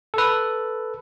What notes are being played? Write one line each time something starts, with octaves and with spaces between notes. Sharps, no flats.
A4 B4